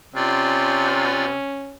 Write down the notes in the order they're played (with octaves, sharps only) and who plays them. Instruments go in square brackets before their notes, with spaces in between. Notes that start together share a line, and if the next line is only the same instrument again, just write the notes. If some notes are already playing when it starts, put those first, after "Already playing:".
[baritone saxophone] C3 [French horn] C#4 [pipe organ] F4 D5